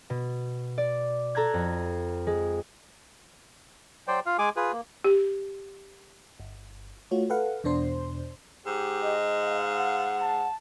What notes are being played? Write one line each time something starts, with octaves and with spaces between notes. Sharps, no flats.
B2
D5
A4 A#5 F#6 G#6
F2
G#3
F#3 C5 D5 G5
F4 F5
G#3 G#4 G#5 D6
F4 G#4 B4
A#3
G4
G1
A3 F4 F#4 C#5
A4 B4 F5 F#5
E2 B2 D4 C5 C6
G#2 G4
D#5
F5
F#5
A5